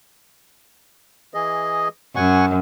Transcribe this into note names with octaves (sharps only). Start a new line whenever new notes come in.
E3 G#4 D#5
F#2 F#5 G#5 C#6